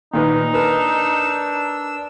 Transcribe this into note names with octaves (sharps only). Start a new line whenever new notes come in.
A#2 D#3 D#4 B4
D4 A#4 B4 E6